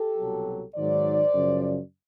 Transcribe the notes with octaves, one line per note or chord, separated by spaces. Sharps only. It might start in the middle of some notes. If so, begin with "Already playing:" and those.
Already playing: G4 A4
C2 B2 F#3
G#2 D#3 F#3 C5 D5
F#2 C#3 F3